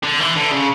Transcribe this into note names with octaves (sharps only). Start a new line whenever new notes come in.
D3
E3
D3
C#3